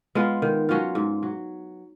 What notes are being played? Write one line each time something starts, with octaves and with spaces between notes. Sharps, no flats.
G#3 B3 F4
D#3
F#3 C#4 F4
G#2
F#3